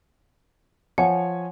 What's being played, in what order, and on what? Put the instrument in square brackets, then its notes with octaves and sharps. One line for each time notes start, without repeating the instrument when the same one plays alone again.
[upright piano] F3 C#5 G#5 [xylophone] F#5